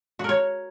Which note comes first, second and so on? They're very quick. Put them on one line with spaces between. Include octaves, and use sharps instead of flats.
F#4 A#4 C#5